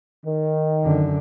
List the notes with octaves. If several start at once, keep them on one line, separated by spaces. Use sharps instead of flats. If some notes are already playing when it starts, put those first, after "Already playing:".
D#3
F#2 D3